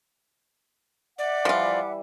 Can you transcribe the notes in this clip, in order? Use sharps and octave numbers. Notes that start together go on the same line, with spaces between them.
D5 E5 F#5 D6
E3 F3 G3 F4